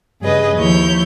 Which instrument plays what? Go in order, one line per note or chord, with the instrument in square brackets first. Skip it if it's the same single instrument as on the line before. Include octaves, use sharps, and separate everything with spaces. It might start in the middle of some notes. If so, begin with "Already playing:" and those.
[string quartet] G2 C#3 G#4 B4 D#5
D#2 F3 E4 C#5 G6